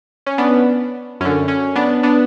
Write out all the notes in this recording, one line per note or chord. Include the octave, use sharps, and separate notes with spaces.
C#4
B3 D4
F#2 D3 C#4
C#4
B3 D4
B3 D4